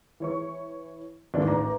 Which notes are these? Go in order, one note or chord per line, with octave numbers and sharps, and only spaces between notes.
E3 C#5 C#6
D#2 G#2 D3 E3 D4
A1 D#3 A#5 D6